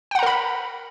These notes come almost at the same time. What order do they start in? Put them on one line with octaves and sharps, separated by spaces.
G5 F#5 A#5 A#4 B5